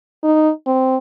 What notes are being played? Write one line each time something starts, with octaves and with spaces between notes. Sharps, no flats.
D#4
C4